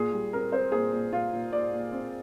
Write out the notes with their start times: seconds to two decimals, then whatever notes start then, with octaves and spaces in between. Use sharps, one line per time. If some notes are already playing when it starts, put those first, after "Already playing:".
Already playing: A#2 G#4
0.13 G3
0.33 C4 A#4
0.52 C4 C5
0.72 A#2 G#4
0.93 A#2
1.13 A#2 F4
1.32 A#2
1.52 A#2 D5
1.72 A#2
1.92 C4